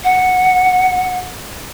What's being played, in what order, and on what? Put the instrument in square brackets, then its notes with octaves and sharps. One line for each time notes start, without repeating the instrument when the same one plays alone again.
[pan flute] F#5